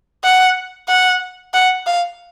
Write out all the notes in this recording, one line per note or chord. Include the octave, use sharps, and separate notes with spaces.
F#5
F#5
F#5
F5